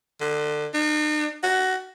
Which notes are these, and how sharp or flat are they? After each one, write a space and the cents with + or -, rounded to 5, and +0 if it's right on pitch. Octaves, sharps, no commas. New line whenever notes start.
D3 +25
D#4 -45
F#4 +20